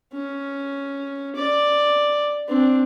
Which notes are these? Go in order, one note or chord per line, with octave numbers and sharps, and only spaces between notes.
C#4
D5
C4 D4